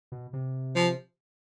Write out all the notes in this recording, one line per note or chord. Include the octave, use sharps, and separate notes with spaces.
B2
C3
F3